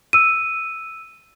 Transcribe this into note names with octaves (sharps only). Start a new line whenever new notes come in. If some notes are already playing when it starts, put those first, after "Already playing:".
E6 D#7